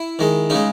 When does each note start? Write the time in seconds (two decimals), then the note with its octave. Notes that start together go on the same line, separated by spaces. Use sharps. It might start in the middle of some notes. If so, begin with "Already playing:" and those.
Already playing: E4
0.19 D#3 G#3
0.50 C#3 G#3 D#4